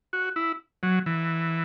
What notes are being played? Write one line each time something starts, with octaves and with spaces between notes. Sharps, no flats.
F#4
E4
F#3
E3